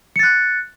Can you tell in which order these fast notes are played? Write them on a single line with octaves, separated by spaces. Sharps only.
C#7 A6 F#6